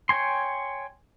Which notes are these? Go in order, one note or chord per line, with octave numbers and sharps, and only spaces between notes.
C#5 G5 G#5 C6